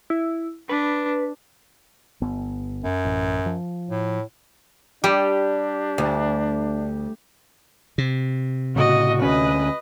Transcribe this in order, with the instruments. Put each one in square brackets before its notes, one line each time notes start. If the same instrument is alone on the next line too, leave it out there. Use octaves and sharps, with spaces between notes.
[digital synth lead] E4
[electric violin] D4 [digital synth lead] B4
[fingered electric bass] G1 B3
[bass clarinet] F#2
[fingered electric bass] A1
F3
[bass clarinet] A2
[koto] G3 [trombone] D4 [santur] G4
[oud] D2
[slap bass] C3
[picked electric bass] A2 C#3 [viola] F#4 D#5
[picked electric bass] D2 A3 C#4 [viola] B4 D#5